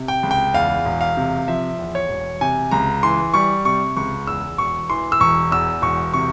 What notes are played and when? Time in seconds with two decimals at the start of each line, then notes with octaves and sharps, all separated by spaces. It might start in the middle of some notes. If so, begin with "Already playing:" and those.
Already playing: C3
0.08 G5
0.23 C#2
0.31 G5
0.54 E2 F5
0.86 E1
1.01 F5
1.17 C3
1.48 F3 E5
1.79 E2
1.95 C#5
2.09 E1
2.41 C3 G#5
2.71 C#2 A#5
3.03 E3 C6
3.34 G3 C#6
3.65 C3 C#6
3.97 C#2 C#6
4.27 E2 E6
4.58 E1 C#6
4.90 E3 C6
5.12 E6
5.20 E1 C#6
5.51 E2 E6
5.82 E1 C#6
6.13 C3 C#6